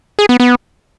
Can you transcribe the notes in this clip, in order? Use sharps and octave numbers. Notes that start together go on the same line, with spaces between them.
G#4
B3
B3